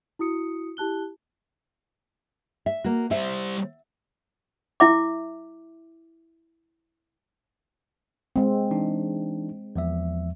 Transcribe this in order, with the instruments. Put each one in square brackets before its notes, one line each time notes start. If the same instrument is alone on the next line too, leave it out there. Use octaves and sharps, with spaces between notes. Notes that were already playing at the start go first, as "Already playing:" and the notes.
[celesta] E4 F#4 D#6 C#7
E4 G4 A5 F#6 G7
[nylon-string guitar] E5
A#3 F#4
[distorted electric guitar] G3 C5 [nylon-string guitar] E5
[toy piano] E4 E5 D6
[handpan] G#3 C4
[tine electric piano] E3 D4 D#4
E2 F3 E5